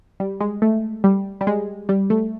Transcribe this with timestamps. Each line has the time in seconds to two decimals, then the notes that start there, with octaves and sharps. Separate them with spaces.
0.20 G3
0.40 G#3
0.62 A3
1.04 G3
1.41 G3
1.47 G#3
1.89 G3
2.10 A3